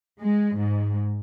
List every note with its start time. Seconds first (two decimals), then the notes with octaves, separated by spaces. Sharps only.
0.21 G#3
0.57 G#2